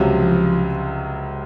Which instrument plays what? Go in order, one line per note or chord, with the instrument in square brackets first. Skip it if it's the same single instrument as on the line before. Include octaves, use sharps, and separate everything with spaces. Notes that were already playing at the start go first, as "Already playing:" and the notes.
Already playing: [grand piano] C#2 C3 F#3 [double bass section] F3